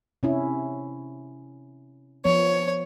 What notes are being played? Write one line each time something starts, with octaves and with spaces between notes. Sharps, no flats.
C3 C#4 E4
F3 B3 C#5